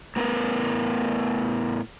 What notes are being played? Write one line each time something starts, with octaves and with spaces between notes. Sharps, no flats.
A2 B3 A#4 B4